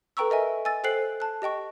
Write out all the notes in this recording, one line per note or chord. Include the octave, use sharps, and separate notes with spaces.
A4 B4 G5 A#5 C#6 E6
A#4 D#5 E5 G#5
G#5 E6 A6
A4 C5 G5 F#6 C7 F#7
A5 F#6
G4 D#5 G5 C#6